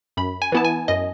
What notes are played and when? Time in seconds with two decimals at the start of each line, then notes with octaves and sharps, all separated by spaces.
0.17 F#2 B5
0.42 G#5
0.52 E3 B3 E4 A5
0.65 G#5
0.88 F#2 D#5